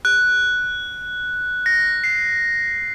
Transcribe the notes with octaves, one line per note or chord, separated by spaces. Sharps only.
F#6
A#6
C7